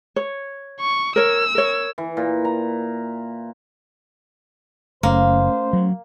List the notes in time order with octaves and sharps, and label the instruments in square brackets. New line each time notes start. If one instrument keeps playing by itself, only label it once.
[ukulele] C#5
[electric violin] C#6
[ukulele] A#4 C#5 [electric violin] E6
[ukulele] A#4 C#5
[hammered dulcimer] E3
A#2
A#5
[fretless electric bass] F#1 [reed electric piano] A3 C#4 [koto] A#3 [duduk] C5
[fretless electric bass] F#3